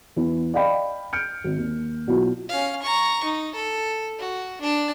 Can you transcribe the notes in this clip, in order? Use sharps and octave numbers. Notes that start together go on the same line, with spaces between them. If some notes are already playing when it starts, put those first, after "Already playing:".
E2 E3
D5 D#5 F5 G5 B5
F6 G6 C#7 D7
G#1
D#2
B1 F#3 E4 F4
C#4 F5
A#5 C#6
D#4
A4
F#4
D4 A5